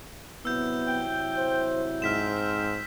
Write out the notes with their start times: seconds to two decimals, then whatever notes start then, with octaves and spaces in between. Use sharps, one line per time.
0.45 C3 F#3 B3 E4 E6 G6
0.88 G5
1.36 C5
2.02 G#2 C4 F6 B6 E7